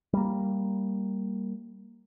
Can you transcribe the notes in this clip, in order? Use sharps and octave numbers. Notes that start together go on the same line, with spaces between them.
G3 A#3